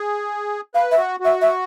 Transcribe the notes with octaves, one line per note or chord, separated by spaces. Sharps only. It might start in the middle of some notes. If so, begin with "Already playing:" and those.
Already playing: G#4
B4 F5
E5
F#4
F#4 E5
E5